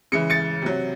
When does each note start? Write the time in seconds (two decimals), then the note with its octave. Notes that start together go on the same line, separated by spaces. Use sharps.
0.12 C#3 E3 G#3 C#7
0.30 A6 C#7
0.62 C3 F#3